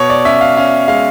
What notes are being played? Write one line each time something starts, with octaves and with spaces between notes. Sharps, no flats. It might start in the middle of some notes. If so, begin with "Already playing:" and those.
Already playing: B2 C#5
D5
C#4 E5
F5
C#4 F5
G#3 F5